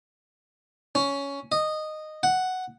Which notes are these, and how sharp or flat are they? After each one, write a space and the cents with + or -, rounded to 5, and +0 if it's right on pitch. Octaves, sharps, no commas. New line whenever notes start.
C#4 +10
D#5 -10
F#5 +5